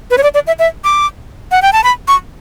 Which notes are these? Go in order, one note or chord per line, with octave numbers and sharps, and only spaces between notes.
B4
C#5
D5
D5
E5
E5
D6
F#5
G5
A5
B5
C#6